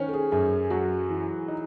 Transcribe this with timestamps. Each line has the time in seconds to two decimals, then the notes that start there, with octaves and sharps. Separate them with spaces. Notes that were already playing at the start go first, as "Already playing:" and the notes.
Already playing: D#3 C#4 D#4 C5 C#5
0.08 A4
0.13 G#4
0.32 F#2 G#4
0.70 F#3 F#4
1.09 E3
1.48 D#4